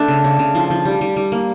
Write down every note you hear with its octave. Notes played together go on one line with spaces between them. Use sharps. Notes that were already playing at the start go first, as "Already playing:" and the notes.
Already playing: A3 D4
C#3
C#3
C#3
F3
F3
G3
G3
G3
A#3